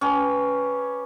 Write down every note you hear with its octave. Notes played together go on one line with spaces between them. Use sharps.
C#4 G4 B4